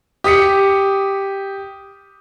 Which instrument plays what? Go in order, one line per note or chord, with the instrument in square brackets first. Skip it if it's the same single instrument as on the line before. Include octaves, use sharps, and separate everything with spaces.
[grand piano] G4 D#6 B6 C#7